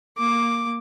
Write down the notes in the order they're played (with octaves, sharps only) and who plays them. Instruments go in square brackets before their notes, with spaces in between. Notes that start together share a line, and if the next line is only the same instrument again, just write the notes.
[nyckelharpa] A#3 D6